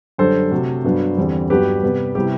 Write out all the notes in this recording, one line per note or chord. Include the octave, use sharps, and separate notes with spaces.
F#2 D3 G3 D4 A4 C5
C3 F#3 A3
G2 F#3 B3 D4
E2 D3 G3 C4
G2 F#3 B3 D4 G4 B4
C3 G3 B3
C3 G3 B3 E4 G4